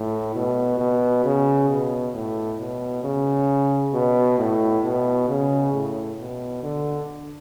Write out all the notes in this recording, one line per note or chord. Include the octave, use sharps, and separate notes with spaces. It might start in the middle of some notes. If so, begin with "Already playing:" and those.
Already playing: A2
B2
B2
C#3
B2
A2
B2
C#3
B2
A2
B2
C#3
A2
B2
D3